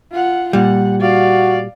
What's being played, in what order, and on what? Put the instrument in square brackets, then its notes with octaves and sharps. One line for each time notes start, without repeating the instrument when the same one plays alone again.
[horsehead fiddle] F4 F#5
[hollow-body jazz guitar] A#2 G3 [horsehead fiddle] F#5
[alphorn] F#4 [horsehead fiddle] D5 F5